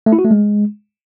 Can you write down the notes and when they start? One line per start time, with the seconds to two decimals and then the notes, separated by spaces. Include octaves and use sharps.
0.06 A3
0.12 E4
0.19 F#4
0.25 A3
0.31 G#3